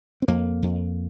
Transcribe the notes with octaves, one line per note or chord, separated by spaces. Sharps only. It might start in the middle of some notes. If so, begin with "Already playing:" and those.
C4
F2 A#3
F2